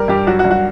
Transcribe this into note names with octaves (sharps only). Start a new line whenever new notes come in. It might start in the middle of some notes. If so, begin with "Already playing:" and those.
Already playing: G3 A#4
G2 G4
F#3 F#4
F#4
G2
F#4